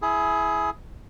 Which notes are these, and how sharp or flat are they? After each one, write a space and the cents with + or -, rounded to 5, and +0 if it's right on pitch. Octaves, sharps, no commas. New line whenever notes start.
E4 +0 G#4 +20